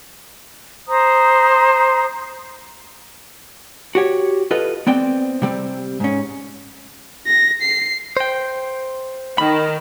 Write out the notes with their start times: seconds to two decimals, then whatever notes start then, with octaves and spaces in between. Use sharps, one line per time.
0.87 C5 A#5 D#6
3.95 F#4 G4 C#5
4.51 F4 A4 B4 D#5
4.87 B3 C4 D5 G5
5.42 C3 G3 C4
6.00 G#2 C#4
7.27 A#6
7.63 C7
8.17 C5 G5
9.38 D#3 B5